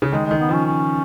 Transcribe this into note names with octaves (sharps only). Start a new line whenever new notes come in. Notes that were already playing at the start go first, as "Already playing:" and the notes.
C#3
D#3 G#3
G#3
D#3
B3
F3 C#4
C#4